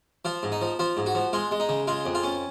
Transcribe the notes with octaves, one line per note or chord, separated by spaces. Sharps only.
F3 F4
G#2
D#4
F3
F3 F4
G#2
F#4
F3
G#3 F4
G#3
D#4
C#3
G#3 F4
F2
F4
C#4